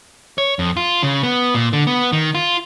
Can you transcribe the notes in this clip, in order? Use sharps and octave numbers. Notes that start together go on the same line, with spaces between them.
C#5
F2
F4
C#3
B3
A#2
D3
B3
D#3
F4